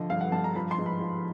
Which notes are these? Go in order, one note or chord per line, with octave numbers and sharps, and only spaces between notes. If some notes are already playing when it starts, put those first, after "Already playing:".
Already playing: D3 F3 D#5
G2 F5
F#5
G2 A5
A#5
F3 B5
C6
G#2
B5
F3